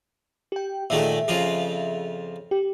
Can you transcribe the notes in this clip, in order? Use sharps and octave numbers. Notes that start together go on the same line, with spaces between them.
G4 G5
A#2 D#3 A3 G#4 E5
F2 C#3 F4
G4